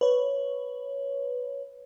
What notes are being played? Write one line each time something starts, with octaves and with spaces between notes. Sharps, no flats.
B4 C#5